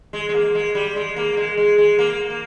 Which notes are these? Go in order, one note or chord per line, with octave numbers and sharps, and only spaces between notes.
G#3
G#3
A#3
G#3
G3
G#3
A#3
G#3
G#3
G#3
A#3
A#3